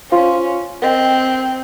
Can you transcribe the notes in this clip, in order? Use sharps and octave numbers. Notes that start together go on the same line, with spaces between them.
C#4 F4 C5 F5 C6
C4 A#4 D#5 G5